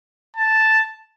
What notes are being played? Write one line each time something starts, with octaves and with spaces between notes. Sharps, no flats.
A5